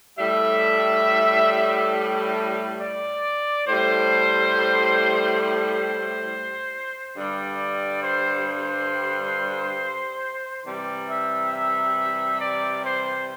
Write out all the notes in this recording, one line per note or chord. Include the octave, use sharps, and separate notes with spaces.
A2 G3 E5
D5
A2 G3 C5
C5
G2 D3 G3 D5
C5
C5
C3 E3 G3 D5
E5
E5
D5
C5